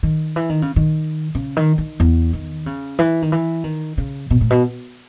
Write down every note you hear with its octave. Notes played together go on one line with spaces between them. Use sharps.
D#3
E3
D#3
C#3
D#3
C#3
D#3
D#3
E2
D#3
C#3
E3
D#3
E3
D#3
C#3
B2
A2
B2